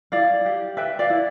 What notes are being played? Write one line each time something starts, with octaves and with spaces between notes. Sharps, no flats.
E4 D5 F5
G4
B4 E5 G5
D5 F5
E4